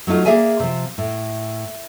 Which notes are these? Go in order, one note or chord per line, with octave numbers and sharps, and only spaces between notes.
F#3 A3 D#4 F4
A#3 G#4 D5 E5 G#5
C3 F3
A2